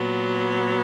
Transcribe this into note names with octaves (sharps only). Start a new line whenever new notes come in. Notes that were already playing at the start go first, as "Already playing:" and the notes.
Already playing: A#2 F#3 B3